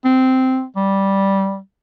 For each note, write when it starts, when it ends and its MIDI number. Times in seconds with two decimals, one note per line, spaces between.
0.05 0.64 60
0.76 1.58 55